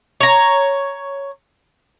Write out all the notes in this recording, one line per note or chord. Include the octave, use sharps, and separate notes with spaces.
C#5 A#5